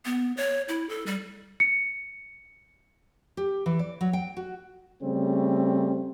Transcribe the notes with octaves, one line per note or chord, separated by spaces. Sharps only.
B3
C#5
E4
A4
G3
C#7
G4
E3
D5
F#3
G5
F#4
C#3 G3 A3 C4